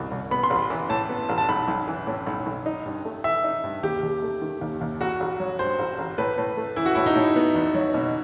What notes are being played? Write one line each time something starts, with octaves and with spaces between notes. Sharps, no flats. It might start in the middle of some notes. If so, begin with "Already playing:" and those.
Already playing: C2 B2
C2
B3 B5
C6
A1
B5
E3
A2 A5
B3
A1
A5
B1 B5
B1
E3
A2
B1
B1
D#4
G2
A3
E3 E5
D#4
G2
D#2 G4
D#2
A3
D#3
D#2
D#2
A1 F#4
A1
F#3
G2 C5
A1
A1
A2 B4
A2
A3
E3 E4
F#4
A2 E4
D#4
A2
B3
E2
F#3
B2